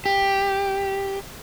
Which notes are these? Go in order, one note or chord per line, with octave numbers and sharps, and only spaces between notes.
G4